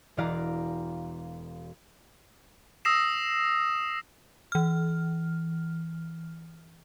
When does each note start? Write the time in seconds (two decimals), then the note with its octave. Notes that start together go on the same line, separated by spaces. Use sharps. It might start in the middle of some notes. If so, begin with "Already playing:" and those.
0.17 E1 E3 D5 F5 A#5
2.85 D#6 E6 A#6 C7 E7
4.52 E3 F6